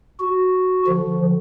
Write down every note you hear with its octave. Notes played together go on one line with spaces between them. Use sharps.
F#4
D3 F3